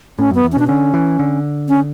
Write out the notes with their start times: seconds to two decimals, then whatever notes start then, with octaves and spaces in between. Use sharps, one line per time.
0.19 A2 C#4
0.31 F#2 B3
0.44 E2
0.52 C#4
0.56 B2 D4
0.67 D3 C#4
0.94 E3
1.19 D3
1.68 C#4